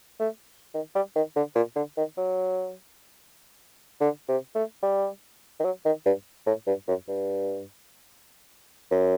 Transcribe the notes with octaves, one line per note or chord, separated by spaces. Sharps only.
A3
D#3
G3
D#3
D3
A#2
D3
D#3
F#3
D3
C3
A3
G3
D#3
F#3
D#3
G2
A2
G2
F#2
G2
F#2